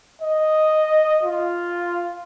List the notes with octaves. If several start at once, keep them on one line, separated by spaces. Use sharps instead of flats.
D#5
F4